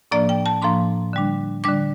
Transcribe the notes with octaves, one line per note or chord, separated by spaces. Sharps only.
A2 F3 A#3 D4 D5
G5
A5
A2 F3 A#3 D4 C6
D3 G3 D4
D3 G3 D4 D6